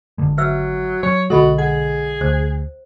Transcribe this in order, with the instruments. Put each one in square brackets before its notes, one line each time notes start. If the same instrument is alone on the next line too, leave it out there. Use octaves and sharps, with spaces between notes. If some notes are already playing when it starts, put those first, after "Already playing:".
[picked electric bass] G#1 D3 G#3
[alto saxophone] F#3 [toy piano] B4 E5 E6
[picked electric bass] F#3 [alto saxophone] C#5
[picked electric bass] B1 D3 G#3 [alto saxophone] F#4 [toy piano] A4 D#5 B5
[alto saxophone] G#4 [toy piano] F#5
[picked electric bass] D2 [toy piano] C5